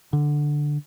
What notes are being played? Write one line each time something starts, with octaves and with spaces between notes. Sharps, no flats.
D3